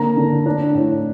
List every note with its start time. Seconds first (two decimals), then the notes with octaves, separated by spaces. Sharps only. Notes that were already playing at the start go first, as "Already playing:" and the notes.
Already playing: D3 A#3 A#5
0.17 D3
0.46 D4
0.75 A2